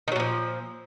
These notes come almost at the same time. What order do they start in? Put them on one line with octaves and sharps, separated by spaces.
D#3 F#3 A#2 F3